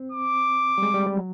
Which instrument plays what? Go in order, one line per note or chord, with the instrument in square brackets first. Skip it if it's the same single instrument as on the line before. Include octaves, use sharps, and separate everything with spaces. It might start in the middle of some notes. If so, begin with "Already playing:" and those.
Already playing: [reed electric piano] C4
[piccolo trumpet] D6
[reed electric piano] G3
G#3
G3
G3
F#3